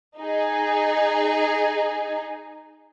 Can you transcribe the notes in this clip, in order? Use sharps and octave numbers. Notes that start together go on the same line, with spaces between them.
D#4 G#4